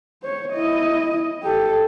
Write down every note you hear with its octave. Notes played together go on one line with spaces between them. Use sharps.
C5 C#5
E4 D#5
G4 A4